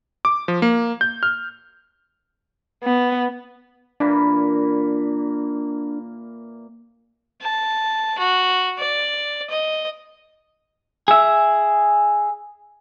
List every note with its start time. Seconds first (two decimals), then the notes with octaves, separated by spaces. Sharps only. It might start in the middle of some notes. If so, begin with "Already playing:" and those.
0.25 D6
0.48 F3
0.62 A#3
1.01 G6
1.23 F6
2.83 B3
4.00 A#2 E3 A#3 D4
7.41 A5
8.19 F#4
8.79 D5
9.50 D#5
11.08 G#4 E5